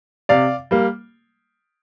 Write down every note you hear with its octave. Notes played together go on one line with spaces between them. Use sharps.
C3 D5 F5
G3 A#3